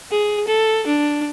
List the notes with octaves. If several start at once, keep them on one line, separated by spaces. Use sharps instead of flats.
G#4
A4
D4